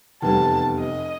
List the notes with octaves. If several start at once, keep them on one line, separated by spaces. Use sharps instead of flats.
F1 E2 G3 A5
D#5